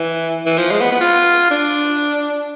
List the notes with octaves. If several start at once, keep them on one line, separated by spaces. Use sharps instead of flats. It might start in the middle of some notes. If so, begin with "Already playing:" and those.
Already playing: E3
E3
F3
G#3
B3
B3
F4
D4